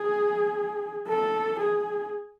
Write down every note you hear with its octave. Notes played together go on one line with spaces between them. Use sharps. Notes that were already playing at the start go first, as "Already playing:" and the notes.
Already playing: G#4
A4
G#4